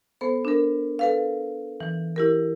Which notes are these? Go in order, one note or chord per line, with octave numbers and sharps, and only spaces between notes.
B3 A4 C5
D4 A#4
A4 B4 F5
E3
E4 G4 A#4